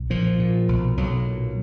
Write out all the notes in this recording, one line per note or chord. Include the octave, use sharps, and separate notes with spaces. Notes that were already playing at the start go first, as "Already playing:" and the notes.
Already playing: B1
A#2 F3
A#2
B1
B1 F#3
A#2